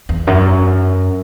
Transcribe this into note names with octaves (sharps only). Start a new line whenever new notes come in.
E2
F#2